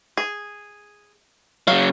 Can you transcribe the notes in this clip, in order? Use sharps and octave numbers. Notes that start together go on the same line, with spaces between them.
G#4
C#3 F#3 F5